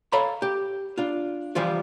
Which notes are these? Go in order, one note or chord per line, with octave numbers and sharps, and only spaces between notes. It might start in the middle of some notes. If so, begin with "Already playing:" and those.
A4 C#5 F5 A#5 B5
G4
D4 F4
E3 F3 G3 F4